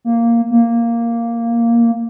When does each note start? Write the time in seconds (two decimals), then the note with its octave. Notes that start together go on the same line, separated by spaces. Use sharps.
0.05 A#3
0.51 A#3